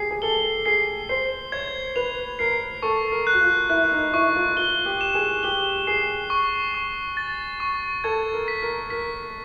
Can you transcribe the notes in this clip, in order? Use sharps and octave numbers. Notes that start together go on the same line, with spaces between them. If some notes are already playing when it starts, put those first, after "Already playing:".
Already playing: G4 G#4 C7
G#4
A4 G7
G#4 C7
C5 C7
C#5 G#6
B4 F7
A#4 C7
A4 C#6
A#4
F#6
F#4
F4
E4 F#6
D#4
E4 C#6
F4
F4 G7
G4
E7
G#4
G4 G7
G#4 C7
C#6
C#6
A6
C#6
A4 G#6
A#4
B6
A#4
A#4 B6